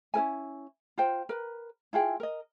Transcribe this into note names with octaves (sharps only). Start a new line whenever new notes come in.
C#4 E4 A#4 G#5
F4 C5 G5
A#4 B4
E4 F4 G#4 G5
A#4 D#5